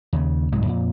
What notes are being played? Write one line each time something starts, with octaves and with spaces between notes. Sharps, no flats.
D#2 C#3
C2 G#2 F#3 G#3
F2 A#2